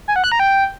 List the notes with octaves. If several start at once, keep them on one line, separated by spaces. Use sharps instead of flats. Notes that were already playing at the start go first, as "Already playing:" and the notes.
G#5
F#5
F#6
A#5
G5